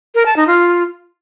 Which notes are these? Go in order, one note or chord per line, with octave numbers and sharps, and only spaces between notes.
A#4
A5
D#4
F4